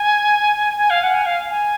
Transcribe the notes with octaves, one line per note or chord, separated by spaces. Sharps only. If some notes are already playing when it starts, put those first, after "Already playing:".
Already playing: G#5
G#5
F5
F#5
G#5
F5
G#5